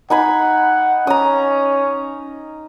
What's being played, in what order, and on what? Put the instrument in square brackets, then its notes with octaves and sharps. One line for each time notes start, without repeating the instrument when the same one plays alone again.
[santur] D#4 G#5 B5 [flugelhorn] F#5
[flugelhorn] C#4 [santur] A#5 D#6